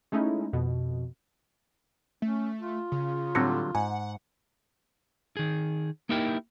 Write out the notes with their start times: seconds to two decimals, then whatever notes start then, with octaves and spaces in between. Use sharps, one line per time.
0.12 G#3 A3 C#4 D#4 E4
0.53 F2 B2
2.22 A3 C#4
2.61 F4
2.92 C#3
3.35 A2 D3 F#3 G3 C4 A#6 C#7
3.75 G#2 F#5 G#5
5.37 D#3 G#4
6.09 A#3 D#4 E4 G4 A#4 G5